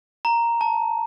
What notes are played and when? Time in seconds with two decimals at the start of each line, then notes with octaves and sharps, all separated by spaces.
0.25 A#5
0.61 A5